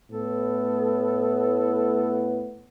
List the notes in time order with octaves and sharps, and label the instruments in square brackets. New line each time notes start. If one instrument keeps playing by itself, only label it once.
[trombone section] A2 B3 [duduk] A4